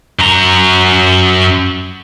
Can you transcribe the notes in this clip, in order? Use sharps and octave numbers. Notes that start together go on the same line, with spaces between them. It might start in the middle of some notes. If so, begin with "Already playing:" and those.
F#2 A#5